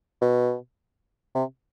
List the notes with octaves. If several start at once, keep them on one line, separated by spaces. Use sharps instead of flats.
B2
C3